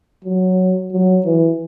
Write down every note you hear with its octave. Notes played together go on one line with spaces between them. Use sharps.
F#3
F#3
E3